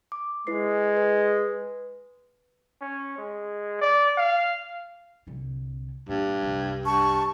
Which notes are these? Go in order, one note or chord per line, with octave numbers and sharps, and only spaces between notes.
D6
G#3 E4 B4 C7
B4
C#4
G#3
D5
F5
C2 D3
G2 A#2
C2 F#2
G2 A5 C#6